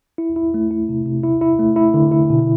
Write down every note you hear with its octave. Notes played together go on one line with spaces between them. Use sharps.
E4
E4
A3
E4
C3
C3
E4
E4
A3
E4
D3
E4
B2